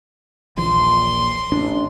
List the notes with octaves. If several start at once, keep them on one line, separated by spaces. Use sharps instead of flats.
D#1 A#1 E3 C6
A1 D4